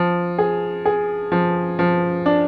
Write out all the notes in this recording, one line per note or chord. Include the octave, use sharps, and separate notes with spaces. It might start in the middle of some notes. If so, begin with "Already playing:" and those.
Already playing: F3
G#4
G#4
F3
F3
D4